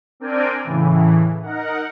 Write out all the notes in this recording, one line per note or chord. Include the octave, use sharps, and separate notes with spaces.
C4 D4 A#4 D5 G5 G#5
A2 C#3 E3
D#4 A#4 F#5